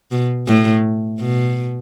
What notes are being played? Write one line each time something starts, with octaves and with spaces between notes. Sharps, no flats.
B2
A2
B2